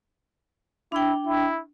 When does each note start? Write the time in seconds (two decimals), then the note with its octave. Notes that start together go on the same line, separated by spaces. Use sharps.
0.92 D4 E4 G5
1.26 E4